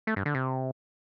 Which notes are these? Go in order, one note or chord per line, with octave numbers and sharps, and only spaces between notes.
A3
G2
D3
C3